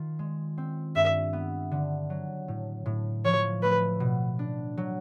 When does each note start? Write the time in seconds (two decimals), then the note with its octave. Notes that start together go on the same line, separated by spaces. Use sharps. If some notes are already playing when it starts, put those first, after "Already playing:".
Already playing: D#3 F4
0.19 G#3
0.58 C4
0.95 G2 E5
1.33 B3
1.71 D3
2.10 F#3
2.48 A2
2.86 A2
3.25 F3 C#5
3.63 A3 B4
4.00 B2
4.39 D4
4.78 F#3